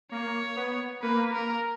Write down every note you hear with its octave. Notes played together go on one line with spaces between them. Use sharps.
A#3 C#5
B3
A#3 B4
A#4